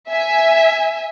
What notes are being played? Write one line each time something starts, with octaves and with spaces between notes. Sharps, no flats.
E5 G#5